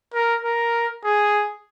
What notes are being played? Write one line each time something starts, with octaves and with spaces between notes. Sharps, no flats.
A#4
A#4
G#4